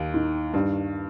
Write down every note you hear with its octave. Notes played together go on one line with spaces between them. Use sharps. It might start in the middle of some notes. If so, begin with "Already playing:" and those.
Already playing: D#2
D#3
G2